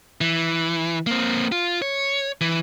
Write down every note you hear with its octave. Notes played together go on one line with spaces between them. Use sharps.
E3
A#3 C4
F4
C#5
E3